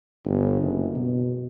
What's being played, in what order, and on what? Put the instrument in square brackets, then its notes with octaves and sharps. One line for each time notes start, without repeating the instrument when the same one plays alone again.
[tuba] G1
F#1
B2